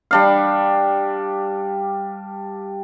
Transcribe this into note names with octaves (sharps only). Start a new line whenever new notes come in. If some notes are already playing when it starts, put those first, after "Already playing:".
G3 D4 F5